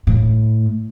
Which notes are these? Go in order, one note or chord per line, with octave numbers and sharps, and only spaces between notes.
A2